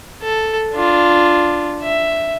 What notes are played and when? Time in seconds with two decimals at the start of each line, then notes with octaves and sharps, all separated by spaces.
0.22 A4
0.74 D4 F4
1.82 E5